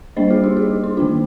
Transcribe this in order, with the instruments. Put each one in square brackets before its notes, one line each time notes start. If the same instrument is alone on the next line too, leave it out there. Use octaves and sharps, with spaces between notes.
[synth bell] G3 A#3 D4 C5 D#5
F4 G#4
D#4 G4
F4 G#4
D#4
D#3 A#3 D4 F4